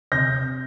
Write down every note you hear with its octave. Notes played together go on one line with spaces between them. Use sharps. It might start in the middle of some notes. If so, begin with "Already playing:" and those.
C3 G6 A#6